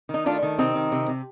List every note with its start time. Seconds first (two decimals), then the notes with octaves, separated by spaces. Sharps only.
0.09 D#3 D#4
0.26 A3 D4 F4
0.43 D#3
0.58 C3 C4 D#4
0.75 D#3
0.92 C3
1.08 C3